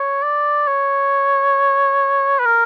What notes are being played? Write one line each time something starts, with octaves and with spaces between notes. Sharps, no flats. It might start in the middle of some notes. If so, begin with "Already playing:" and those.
Already playing: C#5
D5
C#5
B4
A#4